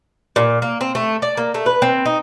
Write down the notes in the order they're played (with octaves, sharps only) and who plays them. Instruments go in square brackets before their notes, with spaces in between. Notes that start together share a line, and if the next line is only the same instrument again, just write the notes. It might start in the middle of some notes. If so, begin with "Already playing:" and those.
[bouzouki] A#2
A#3
C4
A3
D5
A#3
A3
B4
C4
D#4